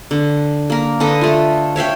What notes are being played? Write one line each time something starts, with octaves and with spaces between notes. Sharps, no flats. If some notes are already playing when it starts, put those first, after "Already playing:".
D3
A#3 A#4
D3 A4 B4 D#5
A3 F4
C#5 E5 F5 G5